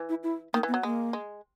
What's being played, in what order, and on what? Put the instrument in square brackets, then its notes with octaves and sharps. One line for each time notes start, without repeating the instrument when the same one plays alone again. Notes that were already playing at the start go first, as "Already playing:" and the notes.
Already playing: [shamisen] E3
[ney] E4
E4
[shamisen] D#3 [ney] A#3
[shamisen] E3
[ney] B3
[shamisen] F#3
[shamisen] G#3 [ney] A#3
[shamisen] G#3